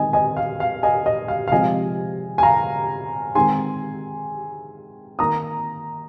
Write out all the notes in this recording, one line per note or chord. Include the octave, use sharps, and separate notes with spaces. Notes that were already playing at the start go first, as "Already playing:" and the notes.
Already playing: D#3 G#3 C4 D#5 G#5
D#5 G#5
F5
F5
D#5 G#5
D#5
F5
F5
C3 F3 G#3 C4 D#5 G#5
G#5
F5 A#5
D#3 G#3 C4 G#5 C6
D#3 A#3 A#5 D#6